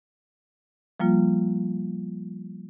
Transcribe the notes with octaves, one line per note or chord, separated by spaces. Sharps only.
F3 G3 A#3 F4